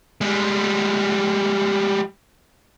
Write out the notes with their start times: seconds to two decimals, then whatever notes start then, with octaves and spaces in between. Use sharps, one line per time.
0.21 G3 G#3